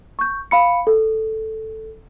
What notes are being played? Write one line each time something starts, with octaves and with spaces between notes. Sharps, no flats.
C#6 G6
F5 B5 C#7
A4